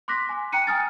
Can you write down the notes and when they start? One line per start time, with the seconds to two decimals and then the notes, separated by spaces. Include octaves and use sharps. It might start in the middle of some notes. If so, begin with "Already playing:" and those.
0.08 C6 D6 F#6 A#6 B6
0.29 G#5
0.52 G5 A#5 F#6 C#7 D#7
0.67 G5 G#5 D#6 F6 A6